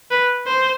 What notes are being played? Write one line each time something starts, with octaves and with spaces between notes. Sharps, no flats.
B4
C5